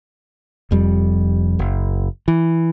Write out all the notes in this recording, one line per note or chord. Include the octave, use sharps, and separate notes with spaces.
F1 F2 G3
F#1
E3